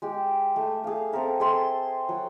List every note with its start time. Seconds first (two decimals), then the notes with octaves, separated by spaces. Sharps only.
0.02 G#3 G4
0.56 A3
0.84 G#4 F5
1.12 C4 A4 A#4 E5
1.40 G#4 A4 E5 C6
2.09 F#3